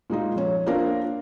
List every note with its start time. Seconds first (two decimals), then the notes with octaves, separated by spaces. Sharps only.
0.10 A#2 G#3 D#4 F4
0.36 F2 C#4
0.66 A#3 C4 D4 F4 A#4